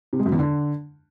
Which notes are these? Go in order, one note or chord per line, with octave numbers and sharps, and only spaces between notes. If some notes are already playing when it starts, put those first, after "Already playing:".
C3
G#3
F#2
E2
D3